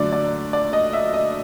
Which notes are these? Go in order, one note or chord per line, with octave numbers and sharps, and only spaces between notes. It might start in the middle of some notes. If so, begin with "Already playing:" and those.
Already playing: D3 F#3 A3 D5
D5
D5
D#5
E5
D#5